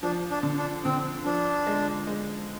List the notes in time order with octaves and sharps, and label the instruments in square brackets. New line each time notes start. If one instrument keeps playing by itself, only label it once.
[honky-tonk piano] F3 [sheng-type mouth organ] D4
[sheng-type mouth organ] D4
[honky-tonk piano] D3
[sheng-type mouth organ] D4
[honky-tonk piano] D3 [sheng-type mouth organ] C4
[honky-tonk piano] F3 [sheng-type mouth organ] D4
[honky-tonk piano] G#3
G#3